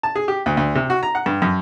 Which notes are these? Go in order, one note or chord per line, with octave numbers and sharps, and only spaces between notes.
A5
G#4
G4
D2
D2
C3
F#4
A#5
F#5
G2
F#2